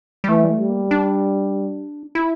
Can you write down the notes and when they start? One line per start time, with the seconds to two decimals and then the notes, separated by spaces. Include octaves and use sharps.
0.24 G3
0.28 E3 A3
0.44 G3
0.50 A3
0.59 G3
0.70 A#3
0.91 D4
2.15 E4